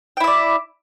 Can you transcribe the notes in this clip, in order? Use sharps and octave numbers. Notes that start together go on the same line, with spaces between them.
E4 D5 E5 G5